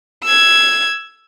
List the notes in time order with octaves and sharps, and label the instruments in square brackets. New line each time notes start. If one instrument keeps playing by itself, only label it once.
[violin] E6 G#6